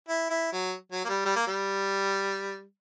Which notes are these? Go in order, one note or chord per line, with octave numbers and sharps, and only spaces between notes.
E4
E4
F#3
F#3
A#3
G3
G3
A#3
G3